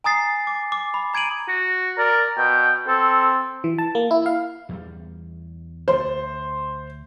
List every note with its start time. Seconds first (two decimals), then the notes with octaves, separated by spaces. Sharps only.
0.04 G#5 A#5 D#6 A6 C7
0.47 D6
0.72 D6
0.94 B5
1.14 A#5 G#6 D7 D#7 F#7
1.48 F#4
1.98 A#4 D5
2.38 B2 G5
2.87 C4 A4
3.64 E3
3.78 A5
3.95 A#3
4.11 E4
4.26 F5
4.69 E2 G3
5.88 D2 D3 C5